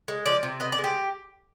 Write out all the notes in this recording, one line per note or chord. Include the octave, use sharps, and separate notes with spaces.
G#3
F3 D5
C3
B3 D#5
D5
G#3
G4